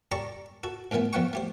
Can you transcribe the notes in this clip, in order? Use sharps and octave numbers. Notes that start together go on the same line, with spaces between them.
G4 A4 D5 A#5 C#6
F#4 A4
D2 A#2 E3 A3 B3
F2 F3 B3 F#5 G5 C#6
A3 G4 C5